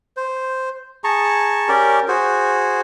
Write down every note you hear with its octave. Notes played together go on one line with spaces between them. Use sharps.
C5
G#4 A5 A#5 C#6
C#4 G4 A#4 D5
F#4 G#4 C5